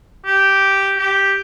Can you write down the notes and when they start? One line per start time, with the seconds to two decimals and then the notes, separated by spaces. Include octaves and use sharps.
0.25 G4
0.98 G4